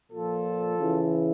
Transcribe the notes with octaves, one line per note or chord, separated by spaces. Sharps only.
A#2 F3 F4 A4
C#3 E3